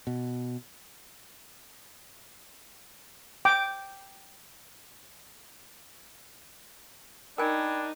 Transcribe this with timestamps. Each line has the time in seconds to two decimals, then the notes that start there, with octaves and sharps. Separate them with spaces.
0.07 B2
3.45 G5 D6
7.38 D4 D#4 A#4 G5 G#5 B5 G#6